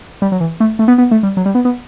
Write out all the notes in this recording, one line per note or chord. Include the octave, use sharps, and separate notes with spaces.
G3
F#3
E3
A3
A3
B3
B3
A3
G3
F#3
G3
B3
B3